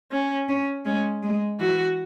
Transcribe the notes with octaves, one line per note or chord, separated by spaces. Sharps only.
C#4
C#4
G#3 C#4
G#3
E3 F#4